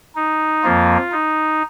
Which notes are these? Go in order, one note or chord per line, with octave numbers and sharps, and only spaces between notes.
D#4
F2 F3 A#3 F4
D#4